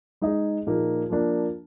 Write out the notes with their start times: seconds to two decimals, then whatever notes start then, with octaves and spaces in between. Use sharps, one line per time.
0.22 G#3 D#4 G#4 D#5
0.67 A#2 F3 A#3 D#4 G#4
1.10 F3 A#3 D4